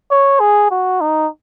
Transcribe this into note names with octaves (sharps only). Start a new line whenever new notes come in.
C#5
G#4
F#4
D#4